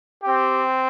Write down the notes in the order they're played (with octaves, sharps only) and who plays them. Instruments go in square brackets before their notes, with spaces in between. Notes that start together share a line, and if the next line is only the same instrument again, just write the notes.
[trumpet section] C4 G4